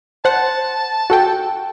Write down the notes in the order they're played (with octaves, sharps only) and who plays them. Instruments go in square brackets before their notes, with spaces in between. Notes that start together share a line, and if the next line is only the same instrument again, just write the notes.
[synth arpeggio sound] C5 F#5 [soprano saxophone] A5
[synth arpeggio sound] F#4 A4 G5